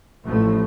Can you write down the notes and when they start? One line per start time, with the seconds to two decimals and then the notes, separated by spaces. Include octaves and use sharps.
0.24 A1 A2 F3 A3